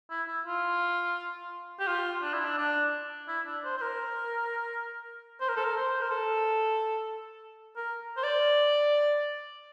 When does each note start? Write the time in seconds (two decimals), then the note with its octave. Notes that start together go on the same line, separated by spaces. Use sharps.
0.10 E4
0.28 E4
0.46 F4
1.80 G4
1.87 F4
2.22 D4
2.33 E4
2.45 D4
2.58 D4
3.28 E4
3.46 D4
3.64 C5
3.77 C5
3.81 A#4
5.41 C5
5.48 A#4
5.56 A4
5.64 A#4
5.76 C5
6.02 A#4
6.11 A4
7.76 A#4
8.17 C5
8.24 D5